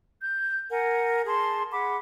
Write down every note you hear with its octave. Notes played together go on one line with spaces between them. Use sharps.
G6
A#4 F#5 G#5
G#4 A5 C6
G#4 F#5 B5 D6